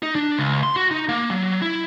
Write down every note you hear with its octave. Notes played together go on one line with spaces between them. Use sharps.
D#4
D4
C#2
C6
F#4
D#4
A#3
F#3
E4